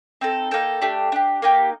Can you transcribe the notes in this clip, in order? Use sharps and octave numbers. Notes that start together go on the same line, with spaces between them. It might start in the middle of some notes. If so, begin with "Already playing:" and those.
C4 D#4 A4
A#3 D#4 A4 G5
A3 D4 G4
D4 G4
A#3 D#4 G4